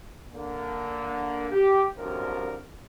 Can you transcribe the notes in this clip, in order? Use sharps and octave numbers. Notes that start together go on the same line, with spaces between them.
D3 A#3
G4
C2 F#2 D3 F3 A#3 A#4